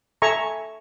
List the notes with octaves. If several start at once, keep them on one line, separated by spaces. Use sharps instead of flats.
A4 E5 G#5 A#5 C#6